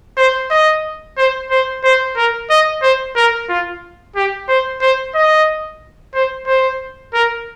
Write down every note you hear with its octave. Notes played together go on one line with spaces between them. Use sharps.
C5
D#5
C5
C5
C5
A#4
D#5
C5
A#4
F4
G4
C5
C5
D#5
C5
C5
A#4